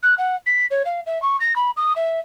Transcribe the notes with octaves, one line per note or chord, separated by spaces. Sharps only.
F#6
F#5
B6
C#5
F5
E5
C#6
A#6
B5
D#6
E5